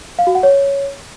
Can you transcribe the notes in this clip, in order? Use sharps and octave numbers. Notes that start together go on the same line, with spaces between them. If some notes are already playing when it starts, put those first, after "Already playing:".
F5
F#4
F#5
C#5